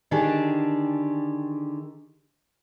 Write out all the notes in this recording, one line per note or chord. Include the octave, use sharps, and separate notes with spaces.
D3 D#3 D4 G4 G#4 A5